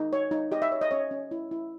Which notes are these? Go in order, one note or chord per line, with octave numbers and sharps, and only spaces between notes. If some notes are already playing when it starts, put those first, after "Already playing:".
Already playing: D#4
C#5
D#4
G4 D#5
E5
C#5
D#5
C#4 C#5
C#4
E4
E4